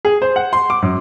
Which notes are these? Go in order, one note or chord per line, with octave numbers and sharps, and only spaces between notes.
G#4
C5
F#5
C6
D6
F#2